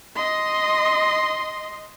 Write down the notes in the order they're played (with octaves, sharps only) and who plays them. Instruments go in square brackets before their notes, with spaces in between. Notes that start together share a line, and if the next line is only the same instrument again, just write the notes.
[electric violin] D#5 C6